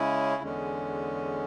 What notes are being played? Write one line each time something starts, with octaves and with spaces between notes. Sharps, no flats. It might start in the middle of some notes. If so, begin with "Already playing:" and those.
Already playing: C#3 G#3 C#4 E4
E2 D3 G#3 C#4